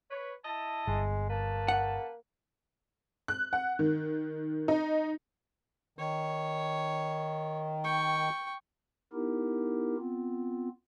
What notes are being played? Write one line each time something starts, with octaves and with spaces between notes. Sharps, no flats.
B4 C#5
E4 D#5 A5
G1 G#3
C#3 A#3 B4 A5
F#5
F#6
F#5
D#3
D#4
D#3 C#5
G5 C#6
B3 D#4 E4 G4 A#4
B3 C4 F4